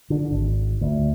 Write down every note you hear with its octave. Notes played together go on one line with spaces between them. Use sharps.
D3
G#1
D2